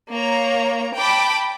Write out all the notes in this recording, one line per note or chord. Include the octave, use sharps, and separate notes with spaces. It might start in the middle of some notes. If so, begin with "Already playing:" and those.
A#3 C#5 A#5
G5 A5 B5 D6